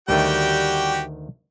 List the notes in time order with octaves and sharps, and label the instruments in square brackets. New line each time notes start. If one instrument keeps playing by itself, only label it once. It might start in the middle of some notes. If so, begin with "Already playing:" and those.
[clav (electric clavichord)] D2 D#3 A3 [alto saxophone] G3 [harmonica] F#4 G4 G5